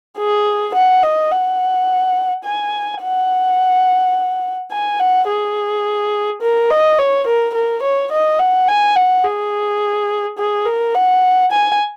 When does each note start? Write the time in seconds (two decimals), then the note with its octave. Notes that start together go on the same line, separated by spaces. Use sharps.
0.18 G#4
0.74 F#5
1.03 D#5
1.31 F#5
2.44 G#5
3.02 F#5
4.71 G#5
4.99 F#5
5.28 G#4
6.41 A#4
6.70 D#5
6.99 C#5
7.27 A#4
7.54 A#4
7.82 C#5
8.12 D#5
8.39 F#5
8.68 G#5
8.96 F#5
9.24 G#4
10.38 G#4
10.66 A#4
10.94 F#5
11.51 G#5